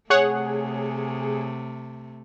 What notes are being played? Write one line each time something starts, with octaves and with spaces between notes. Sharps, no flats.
C3 A3 G#4 C#5 F#5